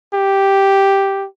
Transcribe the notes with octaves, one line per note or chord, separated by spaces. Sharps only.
G4